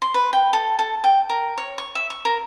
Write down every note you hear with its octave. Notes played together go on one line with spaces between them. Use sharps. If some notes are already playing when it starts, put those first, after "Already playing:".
C6
B4
G5
A4
A4
G5
A#4
C#5
C#6
E5
C#6
A#4